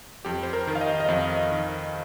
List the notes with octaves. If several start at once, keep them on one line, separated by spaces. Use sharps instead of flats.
F2 G4
C5
A#4
D#3
F5
D#5
D#5
F2 F5
D#3